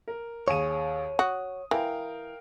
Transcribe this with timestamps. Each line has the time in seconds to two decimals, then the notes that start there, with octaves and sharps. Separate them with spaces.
0.08 A#4
0.48 D#2 G#4 C#5 D#7
1.19 F#4 D#6
1.71 E3 A#4 F5 G5